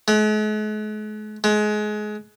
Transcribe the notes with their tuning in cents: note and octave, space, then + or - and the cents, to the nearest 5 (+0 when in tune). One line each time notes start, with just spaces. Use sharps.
G#3 +45
G#3 +25